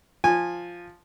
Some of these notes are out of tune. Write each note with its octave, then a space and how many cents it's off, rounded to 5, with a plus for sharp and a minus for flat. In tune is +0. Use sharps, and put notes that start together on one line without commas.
F3 +0 G#5 -20